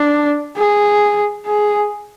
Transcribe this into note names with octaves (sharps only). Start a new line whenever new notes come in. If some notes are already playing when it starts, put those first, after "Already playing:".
Already playing: D4
G#4
G#4